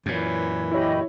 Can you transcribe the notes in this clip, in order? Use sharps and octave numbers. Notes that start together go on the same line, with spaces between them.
F#2 A#2 E3 C#5
E4 G4 C#5 D#5 B5